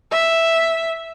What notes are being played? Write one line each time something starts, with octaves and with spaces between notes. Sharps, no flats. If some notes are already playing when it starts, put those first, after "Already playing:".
E5